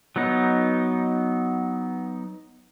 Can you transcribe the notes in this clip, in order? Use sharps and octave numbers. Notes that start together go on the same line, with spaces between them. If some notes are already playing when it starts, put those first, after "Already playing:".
F#3 B3 D#4